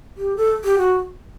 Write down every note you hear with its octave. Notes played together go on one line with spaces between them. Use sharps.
G4
A4
G4
F#4